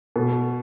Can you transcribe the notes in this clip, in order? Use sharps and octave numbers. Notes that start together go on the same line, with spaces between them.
B2